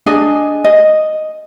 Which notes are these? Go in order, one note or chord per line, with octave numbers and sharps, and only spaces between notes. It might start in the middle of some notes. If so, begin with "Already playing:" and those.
D4 G#4 D#5 G#5
D#5